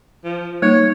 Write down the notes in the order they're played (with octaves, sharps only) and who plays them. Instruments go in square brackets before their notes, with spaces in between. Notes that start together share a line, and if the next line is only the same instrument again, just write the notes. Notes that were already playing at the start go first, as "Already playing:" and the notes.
[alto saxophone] F3
[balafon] G3 A#3 D#4 [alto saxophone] C#5